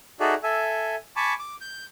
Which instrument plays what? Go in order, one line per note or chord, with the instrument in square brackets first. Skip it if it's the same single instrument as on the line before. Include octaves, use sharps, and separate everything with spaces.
[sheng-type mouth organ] D#4 F#4 G#4 A4 D5 E5
A4 E5 G#5
G#5 A5 B5 C#6 D6
D6
G6